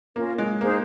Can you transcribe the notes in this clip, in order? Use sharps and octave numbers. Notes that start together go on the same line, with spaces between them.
A#3 C#4 F4 A#4
G#3
A#3 D#4 G#4 C5